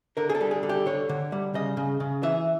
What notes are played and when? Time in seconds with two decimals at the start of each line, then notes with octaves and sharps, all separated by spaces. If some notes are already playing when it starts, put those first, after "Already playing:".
0.17 D3 A#4
0.29 G#4
0.35 A4
0.41 G3
0.51 G#4
0.63 D3
0.69 G4
0.86 D3 C#5
1.09 D3
1.32 G3
1.54 C#3 D#5
1.77 C#3
2.00 C#3
2.23 E3 E5